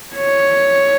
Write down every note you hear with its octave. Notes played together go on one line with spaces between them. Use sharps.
C#5